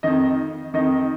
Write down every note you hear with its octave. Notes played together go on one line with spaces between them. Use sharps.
F2 D#3 D#5
F2 D#3 D#5